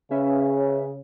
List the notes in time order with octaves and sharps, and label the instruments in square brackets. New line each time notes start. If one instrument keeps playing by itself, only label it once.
[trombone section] C#3 [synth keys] C#4 B4 E5